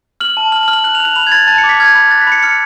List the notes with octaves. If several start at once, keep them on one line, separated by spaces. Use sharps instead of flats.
F6 F#7
A5
F6 F#7
F#7
F6
F#7
F#6 F#7
F7
F#6
F7
B5 F7
G#6
B5 A6
A5 A6
C#7
D6
B6
F6 G#6
B5
F#6 A6
B6
B5 C#7
F6 C#7